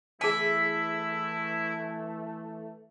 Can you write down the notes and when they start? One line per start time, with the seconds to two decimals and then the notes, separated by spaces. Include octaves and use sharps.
0.21 E3 A3 E4 G#4 E5 A5